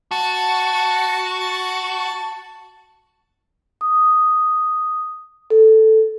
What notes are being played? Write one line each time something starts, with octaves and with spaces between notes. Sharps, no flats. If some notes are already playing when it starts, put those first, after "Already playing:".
F#4 A5
D#6
A4